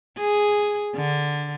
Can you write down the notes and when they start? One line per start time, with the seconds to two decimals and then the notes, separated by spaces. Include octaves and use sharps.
0.18 G#4
0.95 D3